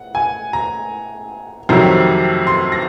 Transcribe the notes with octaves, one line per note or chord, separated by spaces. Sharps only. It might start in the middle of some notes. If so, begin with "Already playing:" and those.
Already playing: F#5
G#5
A#5
F2 C3 D#3 F#3 A#5
C6
A#6